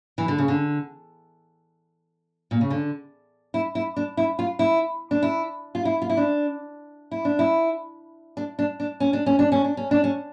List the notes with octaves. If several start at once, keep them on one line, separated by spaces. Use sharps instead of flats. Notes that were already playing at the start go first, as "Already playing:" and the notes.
E3
D3
C#3
D3
A#2
C#3
D3
E4
E4
D4
E4
F4
E4
D4
E4
F4
E4
F4
E4
D4
E4
D4
E4
D4
D4
D4
C#4
D4
C#4
D4
C#4
D4
C#4
D4
C#4